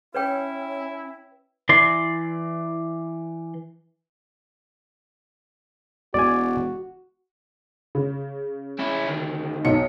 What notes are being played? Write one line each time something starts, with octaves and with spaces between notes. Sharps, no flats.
C#4 E4 B4 C#5 G5
E3 D5 C6
E1 F#4 D5 G#5
C#3
C#4 E4
D2 D#3
B1 D#4 C#7